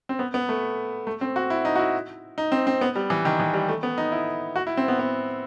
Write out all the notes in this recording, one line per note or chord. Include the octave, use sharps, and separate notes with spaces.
C4
B3
B3
A3
A3
C4
F#4
E4
D#4
F#4
E4
D#4
C4
C4
B3
G3
E3
D#3
E3
G3
A3
B3
D#4
E4
F#4
E4
C4
B3
B3